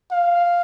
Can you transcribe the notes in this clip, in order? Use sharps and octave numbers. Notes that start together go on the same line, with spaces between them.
F5